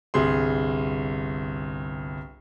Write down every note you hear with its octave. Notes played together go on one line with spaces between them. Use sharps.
G1 C2 G#4 C6